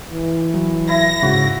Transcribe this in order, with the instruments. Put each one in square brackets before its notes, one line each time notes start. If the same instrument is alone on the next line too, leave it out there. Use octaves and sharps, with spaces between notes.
[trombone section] E3
[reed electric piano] F#3
[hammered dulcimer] E4 [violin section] A#6
[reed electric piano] G#2 C#3 [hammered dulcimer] F#4